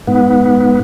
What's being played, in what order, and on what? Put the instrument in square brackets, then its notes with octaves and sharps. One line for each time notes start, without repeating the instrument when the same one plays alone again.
[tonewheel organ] G#2 B3